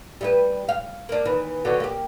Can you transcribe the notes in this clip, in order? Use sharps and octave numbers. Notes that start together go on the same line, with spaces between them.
G3 E4 B4
F5
A#3 D4
D#2 E3
D3 F#3 B3
A#3 G4